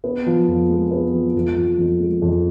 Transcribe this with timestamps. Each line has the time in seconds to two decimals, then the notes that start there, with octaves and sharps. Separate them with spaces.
0.04 B3
0.26 F3
0.48 F2
0.70 G#3
0.91 B3
1.13 F3
1.34 F2
1.57 F3
1.79 F2
2.00 G#3
2.22 F2